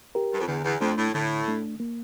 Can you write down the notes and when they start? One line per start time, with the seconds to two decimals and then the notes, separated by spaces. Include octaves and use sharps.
0.15 G4 A#4
0.33 G2
0.40 F2
0.48 E2 D3
0.64 E2
0.81 F2 A3 D4
0.98 A2
1.14 A2 D3
1.48 A3 D4
1.80 A#3